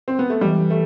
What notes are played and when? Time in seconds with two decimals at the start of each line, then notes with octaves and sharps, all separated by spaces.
0.08 C4
0.19 B3
0.30 A3
0.41 E3 G3
0.70 A3